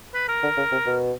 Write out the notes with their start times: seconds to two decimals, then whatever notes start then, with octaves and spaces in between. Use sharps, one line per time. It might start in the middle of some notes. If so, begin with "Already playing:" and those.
0.14 B4
0.28 A#4
0.43 D3
0.57 C#3
0.72 C3
0.86 B2